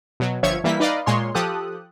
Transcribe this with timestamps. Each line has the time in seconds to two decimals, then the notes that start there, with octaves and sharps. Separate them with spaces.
0.20 B2 F#3
0.43 G1 F3 C#5 E5 C#6 G#6
0.64 E3 G3 A#3 E4 B6
0.80 D#4 B4 D5 D#5 F5
1.06 A#2 G#3 C#5 C6
1.34 F3 G4 A4 D#6 F#6